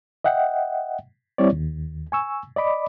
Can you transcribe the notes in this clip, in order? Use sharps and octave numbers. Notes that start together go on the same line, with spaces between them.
D#5 E5 F#5 G5
G3 C4 E4 C#5 D5
D#2
G#5 C#6 E6
D5 D#5 B5 D6